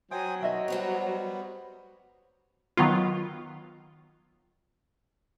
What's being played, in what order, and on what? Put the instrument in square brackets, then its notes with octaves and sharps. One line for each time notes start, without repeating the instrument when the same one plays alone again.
[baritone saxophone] F#3 [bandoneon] C5 G#5 D#6 [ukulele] G5
[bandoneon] B2 D#3 F#4 [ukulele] D#5 E5 G5
[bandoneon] G3 B3 [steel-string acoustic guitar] F#4 C5 C#5
[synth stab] D#3 F#3 B3 F4